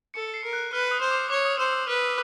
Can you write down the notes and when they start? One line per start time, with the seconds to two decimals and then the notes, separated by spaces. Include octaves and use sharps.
0.14 A4 C#7
0.34 C7
0.44 A#4
0.53 F#6
0.72 B4 F6
0.91 D#6
1.01 C5
1.11 D6
1.30 C#5 D6
1.45 D#6
1.58 C5 E6
1.73 E6
1.88 B4 F6